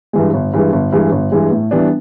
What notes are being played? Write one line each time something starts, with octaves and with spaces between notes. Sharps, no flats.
G2 E3 G#3
G1
G2 E3 G#3
G1
G2 E3 G#3
G1
G2 E3 G#3
A2
E3 G3 B3 D4